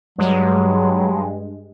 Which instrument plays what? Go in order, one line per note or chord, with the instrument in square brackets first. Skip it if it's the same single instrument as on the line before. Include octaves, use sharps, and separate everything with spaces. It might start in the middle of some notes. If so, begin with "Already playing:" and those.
[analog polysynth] G2 G#3 [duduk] F#3